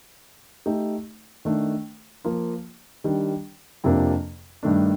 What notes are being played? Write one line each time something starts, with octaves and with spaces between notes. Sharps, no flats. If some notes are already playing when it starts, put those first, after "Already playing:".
A3 D#4 G4
D#3 A3 D4
F3 A#3 F4
D#3 G3 D4
F2 C3 F3 A#3 D4
G2 D#3 A3 D4